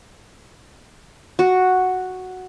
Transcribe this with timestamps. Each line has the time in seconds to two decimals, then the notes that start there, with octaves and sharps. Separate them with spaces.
1.39 F#4